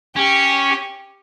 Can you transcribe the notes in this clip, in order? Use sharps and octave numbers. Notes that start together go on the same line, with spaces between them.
C#4 G4